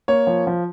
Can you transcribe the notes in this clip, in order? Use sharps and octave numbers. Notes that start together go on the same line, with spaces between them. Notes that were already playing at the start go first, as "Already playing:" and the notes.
A#3 C#5
F3
F3